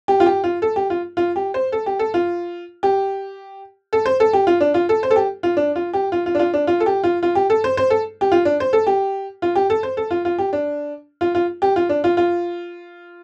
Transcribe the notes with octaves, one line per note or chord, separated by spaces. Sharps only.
G4
F4
G4
F4
A4
G4
F4
F4
G4
C5
A4
G4
A4
F4
G4
A4
C5
A4
G4
F4
D4
F4
A4
C5
A4
G4
F4
D4
F4
G4
F4
F4
D4
F4
D4
F4
A4
G4
F4
F4
G4
A4
C5
C5
A4
G4
F4
D4
C5
A4
G4
F4
G4
A4
C5
A4
F4
F4
G4
D4
F4
F4
G4
F4
D4
F4
F4